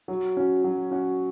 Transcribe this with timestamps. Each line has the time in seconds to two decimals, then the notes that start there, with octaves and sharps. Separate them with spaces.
0.08 F#3
0.37 C#4 F#4
0.64 F#3
0.91 C#4 F#4